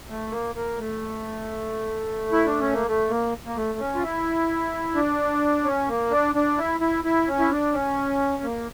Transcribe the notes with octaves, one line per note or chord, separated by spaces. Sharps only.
A3
A#3
A#3
A3
E4
D4
C#4
A#3
A3
A#3
A#3
A3
C#4
F4
E4
D4
C#4
A#3
D4
D4
E4
E4
E4
C#4
E4
D4
C#4
A#3